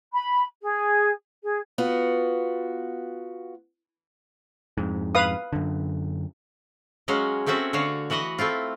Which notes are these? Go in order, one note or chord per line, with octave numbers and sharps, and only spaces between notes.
B5
G#4
G#4
B3 F4 F#4
F2 G#2
B4 F5 D#6
F#2 D3
F#3 G#3 C#4 F#4 F5
A3 C4 C#4 F#4 E5
D3 F#4 C#5 F5
E3 F#4 B4 D#5 F#5
A3 C4 E4 F4